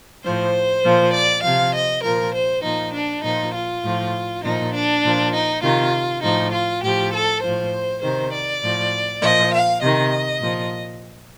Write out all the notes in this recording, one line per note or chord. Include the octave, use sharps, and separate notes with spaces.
A2 F3 C5
A#2 F3
D5
C3 F3 F5
D#5
A#2 F3 A#4
C5
A#2 F3 D#4
D4
A#2 F3 D#4
F4
A2 F3
A#2 F3 D#4
D4
A#2 F3
D#4
C3 D#3 F4
A2 F3 D#4
F4
A2 F3 G4
A4
A2 F3 C5
C3 D#3 C5
D5
A2 F3
A#2 F3 D#5
F5
C3 D#3 D#5
A#2 F3